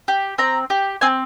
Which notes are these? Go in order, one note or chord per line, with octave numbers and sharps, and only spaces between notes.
G4
C4 A#5
G4
C4 G#5